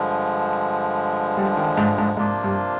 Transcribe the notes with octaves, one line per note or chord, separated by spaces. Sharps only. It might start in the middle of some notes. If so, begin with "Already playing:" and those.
Already playing: G2 D3 F3 G#3
G3
D#3
G#2
G#2
G#2 C3 F3 A#3 D4 F4
G2